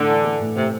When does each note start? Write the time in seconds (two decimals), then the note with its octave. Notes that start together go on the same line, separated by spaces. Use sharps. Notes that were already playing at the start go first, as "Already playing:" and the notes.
Already playing: A2 D3
0.08 E3
0.24 A3
0.40 A2
0.56 A2 C3